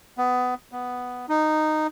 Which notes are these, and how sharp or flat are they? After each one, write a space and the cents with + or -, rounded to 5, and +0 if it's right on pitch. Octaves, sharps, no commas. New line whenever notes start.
B3 +20
B3 +5
D#4 -10